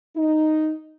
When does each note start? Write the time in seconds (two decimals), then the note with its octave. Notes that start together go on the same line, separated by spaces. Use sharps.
0.16 D#4